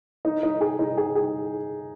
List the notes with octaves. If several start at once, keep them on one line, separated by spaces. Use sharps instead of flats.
D#4
D#4
G#4
D#4
G#4
G#4